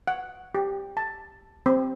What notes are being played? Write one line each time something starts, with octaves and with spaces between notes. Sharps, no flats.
F#5
G4
A5
C4